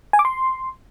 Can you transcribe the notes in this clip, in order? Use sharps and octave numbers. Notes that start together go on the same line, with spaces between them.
G#5
D6
C6